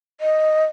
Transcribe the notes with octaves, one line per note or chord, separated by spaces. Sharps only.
D#5